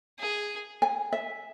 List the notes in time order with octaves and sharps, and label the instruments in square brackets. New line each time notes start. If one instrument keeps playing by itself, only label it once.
[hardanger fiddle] G#4
[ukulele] G#5
E5